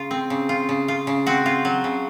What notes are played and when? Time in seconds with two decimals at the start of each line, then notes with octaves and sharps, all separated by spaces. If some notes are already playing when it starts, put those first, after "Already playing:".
Already playing: C#3 F4
0.11 C4
0.30 C#3
0.49 F4
0.69 C#3
0.88 F4
1.07 C#3
1.27 C4 F#4
1.46 F4
1.65 F#3
1.84 C#3